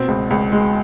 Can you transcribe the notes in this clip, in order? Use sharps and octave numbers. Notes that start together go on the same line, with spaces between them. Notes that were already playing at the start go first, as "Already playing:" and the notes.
Already playing: B2 C4
C#2
C#2
G#3